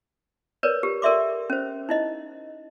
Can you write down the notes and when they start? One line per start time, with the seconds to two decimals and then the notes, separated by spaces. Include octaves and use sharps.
0.63 A#4 B4 C#5 D5
0.83 G4
1.02 A4 A#4 D5 E5 C6 D6
1.50 C#4 C5
1.89 D#4 E4 D#5